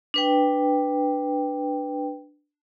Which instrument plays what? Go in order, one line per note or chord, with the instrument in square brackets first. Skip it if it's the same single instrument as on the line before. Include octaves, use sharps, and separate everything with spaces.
[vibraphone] D4 B4 G5